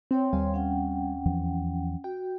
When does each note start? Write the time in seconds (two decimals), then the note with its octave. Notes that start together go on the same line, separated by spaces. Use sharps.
0.11 C4 C#5 G5 C6
0.33 D#2 G3 F5 G#5
0.54 C#4 F#5 G5
1.26 E2 E3 F3
2.04 F#4 G5